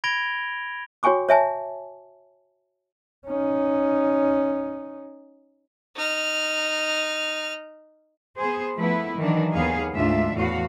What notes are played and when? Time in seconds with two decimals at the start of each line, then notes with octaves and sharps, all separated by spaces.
0.04 B5 G#6 A#6 D7 F7 G7
1.03 F#4 C#5 G5 G#5 C#6 D6
1.29 C#5 E5 G#5 A5
3.27 C#4 D#4
5.96 D#4 F6
8.38 B3 G#4 C5
8.75 F3 A3 B3 E4 B4
9.17 D#3 E3 F#3 D4
9.53 D#2 B3 G#4 F5
9.93 D2 G#2 D4 F4 E5
10.34 E2 A2 F#4 F5